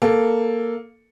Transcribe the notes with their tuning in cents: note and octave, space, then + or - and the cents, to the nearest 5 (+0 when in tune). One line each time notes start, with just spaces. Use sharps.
A#3 +0 A4 +0